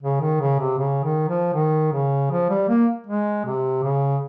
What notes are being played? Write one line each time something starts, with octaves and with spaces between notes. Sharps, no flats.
C#3
D#3
C#3
C3
C#3
D#3
F3
D#3
C#3
F3
G3
A#3
G#3
C3
C#3